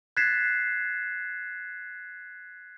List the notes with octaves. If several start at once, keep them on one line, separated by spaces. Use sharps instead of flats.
F#6 G#6 A6 B6 C7 E7